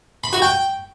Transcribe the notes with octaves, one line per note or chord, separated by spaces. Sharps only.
B5
F#4
G5